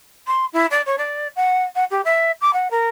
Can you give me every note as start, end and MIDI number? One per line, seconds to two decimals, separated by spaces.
0.27 0.45 84
0.53 0.66 64
0.71 0.82 74
0.86 0.96 73
0.98 1.28 74
1.36 1.63 78
1.75 1.84 78
1.91 2.01 67
2.05 2.32 76
2.41 2.51 86
2.53 2.70 78
2.71 2.89 70